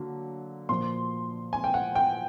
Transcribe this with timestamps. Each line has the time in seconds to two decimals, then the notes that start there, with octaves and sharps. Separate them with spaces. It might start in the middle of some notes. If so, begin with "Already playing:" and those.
Already playing: D3 F#3 A#3
0.69 A#2 F3 A#3 C6
1.53 G#5
1.64 G5
1.74 F#5
1.95 G5